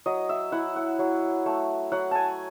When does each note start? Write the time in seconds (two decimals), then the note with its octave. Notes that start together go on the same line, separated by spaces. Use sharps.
0.06 F#3 D#5
0.29 E5
0.52 E4 F#5
0.76 F#5
0.99 F#3
1.46 A3
1.92 F#3 F#5
2.11 G#5 A5